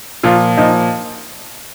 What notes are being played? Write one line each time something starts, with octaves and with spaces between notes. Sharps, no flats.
A#2 F3 F4
A#2 F3 D#4